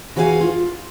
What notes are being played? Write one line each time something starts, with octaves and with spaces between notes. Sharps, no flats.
E3 F#4 G#4 C5 F5 G#5
F4